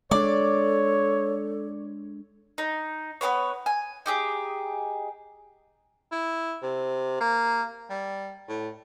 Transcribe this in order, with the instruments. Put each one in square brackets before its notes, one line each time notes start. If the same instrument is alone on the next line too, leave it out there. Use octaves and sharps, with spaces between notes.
[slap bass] G#3 D4 [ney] A4 [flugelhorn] C#5 [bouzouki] D5
[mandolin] D#4
B3 F4 B4 C#5
G#5
D#4 G4 G#4
[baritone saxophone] E4
C3
A#3
G3
A2